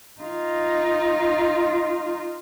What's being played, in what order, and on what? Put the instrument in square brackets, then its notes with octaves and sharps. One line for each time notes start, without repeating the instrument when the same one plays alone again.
[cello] D#4 F4